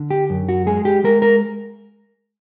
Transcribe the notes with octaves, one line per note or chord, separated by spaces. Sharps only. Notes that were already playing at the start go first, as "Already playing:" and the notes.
Already playing: D3
G4
F#2
F#4
G#3 G#4
G4
G#3 A#4
A#4